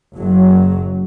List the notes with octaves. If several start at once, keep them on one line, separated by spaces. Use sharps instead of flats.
F#1 F#3